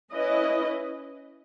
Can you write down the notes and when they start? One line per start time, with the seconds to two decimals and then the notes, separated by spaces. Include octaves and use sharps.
0.13 C#4 E4 B4 D#5